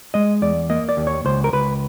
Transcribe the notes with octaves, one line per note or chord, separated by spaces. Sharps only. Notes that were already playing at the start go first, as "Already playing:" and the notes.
G#3 D#5
E2 D5
A#3 D#5
D5
D#2
C#5
C#2 C5
A#4
C#2 B4